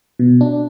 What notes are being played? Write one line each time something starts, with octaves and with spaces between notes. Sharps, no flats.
B2
D4